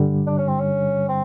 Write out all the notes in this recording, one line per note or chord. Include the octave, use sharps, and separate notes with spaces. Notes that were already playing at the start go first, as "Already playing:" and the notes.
Already playing: G2 D3 G3
D4
C#4
C4
C#4
C4